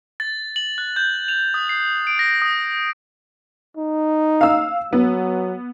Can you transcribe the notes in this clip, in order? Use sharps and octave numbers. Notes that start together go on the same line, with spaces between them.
A6
F#7
F#6
G6
F7
D#6
C7
D7
A#6
D#6
D#4
F5 E6
F#3 B3